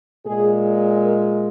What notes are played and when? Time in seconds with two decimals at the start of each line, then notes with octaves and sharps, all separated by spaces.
0.25 A#2 G#3 G#4
1.01 A#4